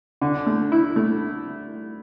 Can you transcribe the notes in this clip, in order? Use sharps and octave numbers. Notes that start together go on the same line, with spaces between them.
D3
A3
E4
A3